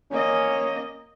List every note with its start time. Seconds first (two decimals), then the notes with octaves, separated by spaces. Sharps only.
0.12 A#3 C#4 D#5